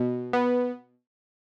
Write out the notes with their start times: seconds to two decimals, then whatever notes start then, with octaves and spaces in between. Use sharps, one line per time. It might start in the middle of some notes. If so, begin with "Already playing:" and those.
Already playing: B2
0.33 B3